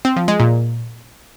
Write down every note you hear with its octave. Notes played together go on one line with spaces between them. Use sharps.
C4
F3
G#3
A#2